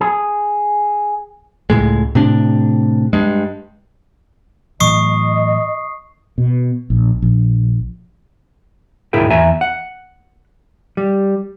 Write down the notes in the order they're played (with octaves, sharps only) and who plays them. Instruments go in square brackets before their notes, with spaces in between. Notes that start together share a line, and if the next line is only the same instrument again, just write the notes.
[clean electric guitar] G#4
[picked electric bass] C#2 A2 G#3
A2 C3 D4
G2 G#3
[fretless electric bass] A2 E3 F#3 [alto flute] D#5 [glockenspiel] C#6 D#6 C7
[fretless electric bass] B2
A#1
A#1
[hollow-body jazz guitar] D2 G#2 E4 G#4 A#4 G5
E2 E5 G#5 A#5
F#5
G3